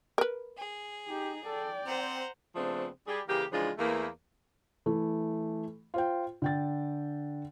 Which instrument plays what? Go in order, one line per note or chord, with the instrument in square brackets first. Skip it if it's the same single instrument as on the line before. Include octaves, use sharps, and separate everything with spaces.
[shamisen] A#4 B4
[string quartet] G#4
[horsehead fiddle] D#4 [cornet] G4
[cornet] A4 [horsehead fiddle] D5 G5
[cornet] C4 [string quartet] C5 F#5 A#5
[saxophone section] C#3 F3 A3 B3 C4 D4
G3 G4 G#4
C#3 E3 A#3 G4
C#3 E3 F3 G#3 D4 F4
E2 E3 A3 A#3
[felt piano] E3 A3
F4 C5 G5
D3 G5 A6